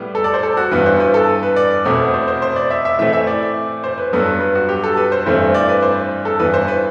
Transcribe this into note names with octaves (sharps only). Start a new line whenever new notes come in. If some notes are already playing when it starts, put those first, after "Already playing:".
Already playing: A2 G3 B3
A4
D5
C5
A4
F#4
G2 E3 B3 B4
C5
B4
A4
B4
B4
D5
E2 B2 A3 C4
C5
C5
C5
D5
E5
E5
A2 E3 A3 C4 E5
E5
D5
C5
B4
G2 F#3 B3 A4
B4
B4
F#4
G4
A4
B4
C5
G2 E3 A3 C4 C5
D5
B4
C5
A4
G2 E3 B3 B4
C5
B4